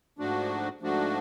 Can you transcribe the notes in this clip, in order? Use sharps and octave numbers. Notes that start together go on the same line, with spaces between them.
G#2 F3 A3 D4 F#4
G#2 F3 A3 D4 F#4